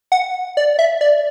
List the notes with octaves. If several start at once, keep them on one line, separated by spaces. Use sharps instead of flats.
F#5
D5
E5
D5